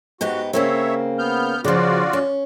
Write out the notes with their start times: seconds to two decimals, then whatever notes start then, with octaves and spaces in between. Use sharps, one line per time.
0.21 G#2 B3 F#4 G4
0.53 C#3 A#3 C4 C#5 E5
1.18 B3 F6 G6
1.64 C#3 F3 F4 F#4 D5
2.13 C#4